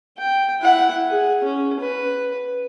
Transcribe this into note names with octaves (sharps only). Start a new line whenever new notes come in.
G5
E4 F#5
G#4
C#4
B4